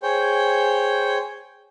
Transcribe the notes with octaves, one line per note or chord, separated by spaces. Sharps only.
G#4 C5 C#5 G5